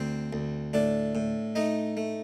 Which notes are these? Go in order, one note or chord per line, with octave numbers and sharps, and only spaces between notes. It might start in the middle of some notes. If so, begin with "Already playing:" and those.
Already playing: D2 C4 C5
D2
A2 D4 D5
A2
A3 D#4 D#5
A3